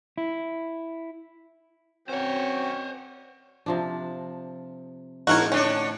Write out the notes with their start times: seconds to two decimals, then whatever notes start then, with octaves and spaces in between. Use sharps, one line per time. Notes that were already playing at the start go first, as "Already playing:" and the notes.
0.18 E4
2.09 C4 C#4 F#4 C5 C#5 G5
3.66 C3 F3 D4
5.27 E2 A2 D4 D#4 F#4 A#4 C#5 F5
5.52 D3 C#4 D4 C#5